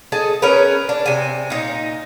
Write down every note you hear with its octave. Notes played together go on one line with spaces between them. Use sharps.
G#4 A4 D#5
C#4 G#4 A#4 B4
D4
C3 G#5
A#2 D#4